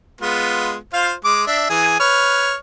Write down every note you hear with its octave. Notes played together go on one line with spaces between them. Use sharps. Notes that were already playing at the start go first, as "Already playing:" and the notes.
G#3 B3 F4
F4 C5 F5
G#3 D6
D4 E5
E3 G#4 G#5
B4 C#5 F6